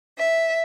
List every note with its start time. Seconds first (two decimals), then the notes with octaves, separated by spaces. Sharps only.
0.19 E5